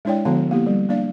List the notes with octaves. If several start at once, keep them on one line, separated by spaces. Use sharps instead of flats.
G#3 D4 E4 C#5 D5 G5
D3 F3 B3 F#4 F5 A5
A#3 B3 E4 G4
G3
A#3 D4 D5 F5